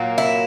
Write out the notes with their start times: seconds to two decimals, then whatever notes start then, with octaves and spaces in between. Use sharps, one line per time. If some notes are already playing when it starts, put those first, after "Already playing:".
Already playing: A#2 F#3 A#3
0.18 E4